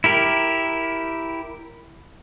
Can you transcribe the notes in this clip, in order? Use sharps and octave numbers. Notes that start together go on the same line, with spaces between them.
E4 G4 A#4